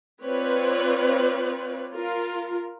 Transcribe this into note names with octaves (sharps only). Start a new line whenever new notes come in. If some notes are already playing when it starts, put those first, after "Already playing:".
C4 F4 B4 C#5 D5
F4 A#4